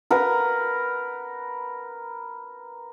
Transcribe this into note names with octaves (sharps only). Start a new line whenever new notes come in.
A#4 B4 F#5